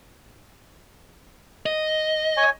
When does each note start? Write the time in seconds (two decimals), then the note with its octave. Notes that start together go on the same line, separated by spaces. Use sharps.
1.66 D#5
2.37 C#5 G#5